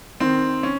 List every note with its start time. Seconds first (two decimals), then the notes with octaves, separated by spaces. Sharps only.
0.20 D#3 C4
0.63 C#4